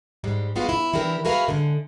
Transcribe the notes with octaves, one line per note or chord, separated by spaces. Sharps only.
G#2 G3 G#3
G#3 B3 F4 F#4
E4
E3 D4 E4 G4 A#4
F#4 G#4 A#4 B4 E5 F5
D3 G#3